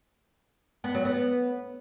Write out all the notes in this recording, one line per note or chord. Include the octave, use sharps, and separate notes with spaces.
B3
F#3
B3